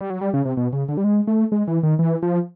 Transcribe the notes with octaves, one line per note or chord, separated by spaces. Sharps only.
G3
F#3
G3
C#3
C3
B2
C#3
D3
G3
G#3
A3
G#3
E3
D#3
E3
F3